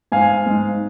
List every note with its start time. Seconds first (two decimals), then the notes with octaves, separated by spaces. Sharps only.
0.12 G#2 F5 G#5
0.46 G#2